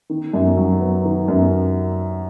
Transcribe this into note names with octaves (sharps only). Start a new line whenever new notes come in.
D#3
F#2
F#3
B3
D#3
F#2